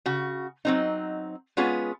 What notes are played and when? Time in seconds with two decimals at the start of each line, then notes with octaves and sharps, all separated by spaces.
0.06 C#3 F#4
0.65 F#3 C4 D#4
1.57 G#3 B3 C#4 F4 G#4